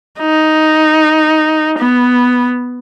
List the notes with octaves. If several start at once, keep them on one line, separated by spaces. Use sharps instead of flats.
D#4
B3